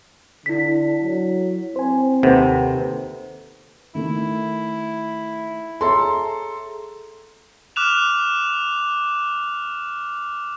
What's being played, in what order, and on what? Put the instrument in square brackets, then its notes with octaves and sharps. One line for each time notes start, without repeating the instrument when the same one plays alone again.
[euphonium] D3 [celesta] E4 B6
[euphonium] F#3
[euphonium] C4 [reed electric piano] C5 G#5
[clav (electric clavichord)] D#2 C3 [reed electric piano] A4 B4 C5 [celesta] F#5
[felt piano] D#3 A3 [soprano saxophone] E4
[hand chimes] G#4 A#5 [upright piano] A4 C6 [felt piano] C#5 E5
[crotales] D6 F6 F#6 E7 F7